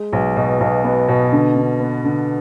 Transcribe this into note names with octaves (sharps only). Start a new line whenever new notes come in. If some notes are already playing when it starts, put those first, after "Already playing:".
Already playing: G#3
B1
B2
B1
B3
B2
D3
D3
B3
D3